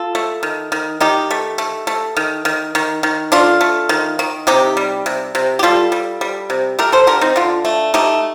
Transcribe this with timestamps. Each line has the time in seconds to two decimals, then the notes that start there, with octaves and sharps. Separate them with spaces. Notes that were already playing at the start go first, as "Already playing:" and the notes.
Already playing: F4 A4
0.15 A3
0.43 D#3
0.72 D#3
1.00 D#3 D#4 G4
1.31 A3
1.58 A3
1.87 A3
2.17 D#3
2.45 D#3
2.75 D#3
3.03 D#3
3.32 A3 D4 F4
3.61 A3
3.89 D#3
4.19 D#3
4.47 C3 D#4 G4
4.77 G3
5.06 C3
5.35 C3
5.59 G4
5.63 G3 F4 A4
5.92 G3
6.21 G3
6.50 C3
6.79 A3 G4 A#4
6.92 A4 C5
7.07 D3 G4 A#4
7.21 C4 D#4
7.36 D3 D4 F4
7.65 A3
7.94 A3 D#4 G4